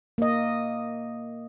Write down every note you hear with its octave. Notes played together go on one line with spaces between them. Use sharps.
A#3 D#5